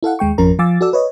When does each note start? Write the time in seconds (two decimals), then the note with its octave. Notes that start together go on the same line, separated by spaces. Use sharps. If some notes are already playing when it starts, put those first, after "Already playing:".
0.03 E4 A4 F5 F#5
0.19 D#2 G#3 G5 C#6
0.38 G#1 F2 F3 C#4 A#4 A#5
0.59 F3 F5 G#5 D6 E6 A6
0.81 F#4 A4 D5 E6
0.93 B4 C#5 D#5